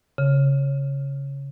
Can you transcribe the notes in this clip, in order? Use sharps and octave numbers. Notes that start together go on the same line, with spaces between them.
C#3